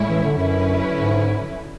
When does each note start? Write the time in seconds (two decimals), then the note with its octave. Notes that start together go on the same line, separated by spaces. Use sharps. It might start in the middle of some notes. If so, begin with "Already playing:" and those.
Already playing: A2 G#3 C#4 E4
0.09 E3
0.24 D3
0.38 F#2 D3 F#3 C#4 E4 B4
0.97 G#2